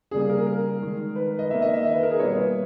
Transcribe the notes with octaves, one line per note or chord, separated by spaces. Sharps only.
C#3 G3 A#3 G#4
A#4
A#4
D#3 G#3
B4
D#5
D#3 A#3 E5
D#5
E5
D#5
B4
A#4
G#4
B2 G3 A#3 C#5
B4